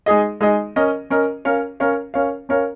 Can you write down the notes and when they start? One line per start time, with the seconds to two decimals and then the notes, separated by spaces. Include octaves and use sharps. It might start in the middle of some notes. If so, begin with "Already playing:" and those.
0.06 G#3 D#4 G#4 D#5
0.41 G#3 D#4 G#4 D#5
0.76 C#4 A#4 D#5
1.10 C#4 A#4 D#5
1.45 C#4 A#4 C#5 F5
1.80 C#4 A#4 C#5 F5
2.14 C#4 A#4 C#5 F5
2.49 C#4 A#4 C#5 F5